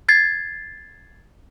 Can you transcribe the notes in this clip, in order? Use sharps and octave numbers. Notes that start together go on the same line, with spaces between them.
G#6 A6 C7